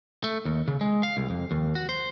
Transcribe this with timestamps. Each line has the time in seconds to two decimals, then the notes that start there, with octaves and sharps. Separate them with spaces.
0.24 A3
0.45 D#2
0.68 C#3
0.81 G#3
1.03 F5
1.17 C2
1.30 F2
1.51 D#2
1.75 F#4
1.89 C5